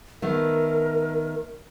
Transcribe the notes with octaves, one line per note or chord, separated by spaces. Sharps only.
D#3 A3 B3 A#4